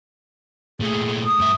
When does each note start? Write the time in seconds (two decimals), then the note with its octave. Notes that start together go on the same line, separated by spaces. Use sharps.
0.80 A#2 A3 G#4
1.25 D#6
1.40 G2 E5